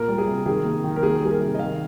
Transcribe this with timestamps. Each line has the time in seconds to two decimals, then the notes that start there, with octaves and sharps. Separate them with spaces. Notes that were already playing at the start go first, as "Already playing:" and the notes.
Already playing: A#2 A#3 A#4
0.08 G3
0.18 G#4
0.27 C3
0.46 D#3 G#4
0.65 A#3
0.84 D#3
0.96 A#4
1.03 A#3 G#4
1.22 G3 G#4
1.31 A#4
1.40 C3
1.55 D#5
1.59 D#3 F5